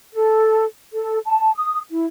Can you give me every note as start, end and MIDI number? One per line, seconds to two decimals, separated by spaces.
0.12 0.64 69
0.92 1.18 69
1.25 1.52 81
1.55 1.79 87
1.90 2.06 64